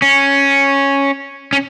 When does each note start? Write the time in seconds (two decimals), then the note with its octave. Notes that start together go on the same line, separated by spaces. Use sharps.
0.02 C#4
1.53 C#4